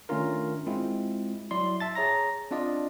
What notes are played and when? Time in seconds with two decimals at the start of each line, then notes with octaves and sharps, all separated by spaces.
0.09 D#3 A3 C#4 D4 F4 A#4
0.67 G#3 C4 E4 F4
1.51 F#3 E4 D5 C6
1.80 E5 A5 A6
1.95 G#4 C#5 A#5 A#6
2.51 C4 D4 F4 D5 D#5